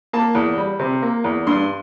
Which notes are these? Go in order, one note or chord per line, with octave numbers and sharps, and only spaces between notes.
A#3 A5
E2
G3
C3
A#3
E2
G2 C6